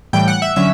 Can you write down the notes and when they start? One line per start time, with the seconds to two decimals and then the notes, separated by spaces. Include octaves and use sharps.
0.13 A2 E3 G3 G5
0.28 F#5
0.42 E5
0.56 D3 F#3 C#4 E5